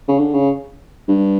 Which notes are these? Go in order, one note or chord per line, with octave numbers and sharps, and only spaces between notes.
C#3
D3
C#3
G2